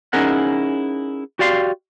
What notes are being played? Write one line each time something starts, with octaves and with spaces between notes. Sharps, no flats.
C#4 D#4 E4 G#4 A#4 F#5
F#4 G4 D5 F5 C6